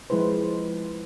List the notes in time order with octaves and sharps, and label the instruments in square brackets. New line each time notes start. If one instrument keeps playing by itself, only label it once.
[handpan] F3 G#3 E4 B4 C5